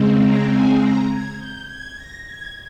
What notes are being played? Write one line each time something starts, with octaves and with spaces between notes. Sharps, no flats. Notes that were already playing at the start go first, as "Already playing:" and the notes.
Already playing: C#3 G#3 C4
A#5
G#5
A#5
G#6
G6
G#6
A#6
G#6